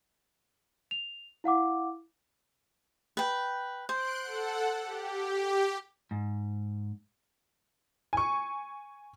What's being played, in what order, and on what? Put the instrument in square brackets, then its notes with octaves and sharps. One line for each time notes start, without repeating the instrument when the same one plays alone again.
[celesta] F7
E4 F5 F#5 D6
[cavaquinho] B4 G5
[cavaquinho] C5 [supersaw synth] C6 F#6 D7
[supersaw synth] A4 F#5
G4
[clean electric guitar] G#2
[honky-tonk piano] G#5 C#6